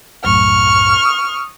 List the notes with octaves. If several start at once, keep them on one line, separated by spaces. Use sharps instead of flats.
C2 F#2 A2 C#6 F6
D#6